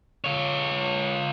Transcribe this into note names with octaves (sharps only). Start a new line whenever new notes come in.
F4 C#5